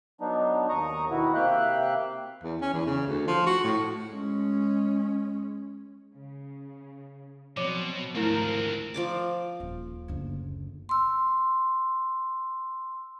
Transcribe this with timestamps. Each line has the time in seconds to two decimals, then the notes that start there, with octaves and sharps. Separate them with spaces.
0.21 F#3 B3 D4 D#4
0.69 D#2 A#5 C#6 D#6
1.10 B2 D#3 E4 F#4
1.35 C3 A#3 E5 F5 G5 F#6
2.43 E2
2.61 C#4
2.73 E2
2.87 C#3
3.07 D2
3.27 F3
3.46 F#4
3.64 A2
4.07 G#3 C#4
6.13 C#3
7.57 B2 F3 F#3 C4 C#5 D6
8.15 G#1 D2 F3 A3 C4 D4 E4 A#4
8.94 F3 D5 D6
9.60 D#1
10.08 F#1 D2
10.89 C6 E6